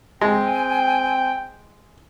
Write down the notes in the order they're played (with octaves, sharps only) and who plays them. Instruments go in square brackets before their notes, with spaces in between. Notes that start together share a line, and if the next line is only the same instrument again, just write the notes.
[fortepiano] G#3 [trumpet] C4 [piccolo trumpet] G5 [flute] G#5